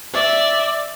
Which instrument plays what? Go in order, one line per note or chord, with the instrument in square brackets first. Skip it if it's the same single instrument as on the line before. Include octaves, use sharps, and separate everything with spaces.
[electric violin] D5 E5